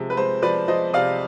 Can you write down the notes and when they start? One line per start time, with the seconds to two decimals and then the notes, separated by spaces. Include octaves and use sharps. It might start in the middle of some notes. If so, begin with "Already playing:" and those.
Already playing: C3 F3 G#3
0.10 B4
0.17 G#3 C5
0.42 F3 B4 D5
0.68 F3 C5 D#5
0.94 C3 D5 F5